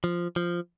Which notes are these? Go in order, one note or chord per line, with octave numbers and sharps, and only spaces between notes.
F3
F3